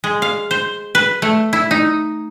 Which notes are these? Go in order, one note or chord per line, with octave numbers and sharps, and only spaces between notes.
G#3
F5
C5
B4
A3
E4
D#4